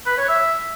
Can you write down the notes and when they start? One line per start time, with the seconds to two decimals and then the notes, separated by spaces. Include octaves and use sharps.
0.06 B4
0.18 C#5
0.29 E5